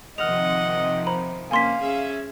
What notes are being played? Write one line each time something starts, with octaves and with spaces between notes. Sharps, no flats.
C3 D#3 F3 D#5 F#5 F6 F7
C5 A#5 B5
A#3 C#4 F5 G#5 C6 B6
C#4 G#4 E5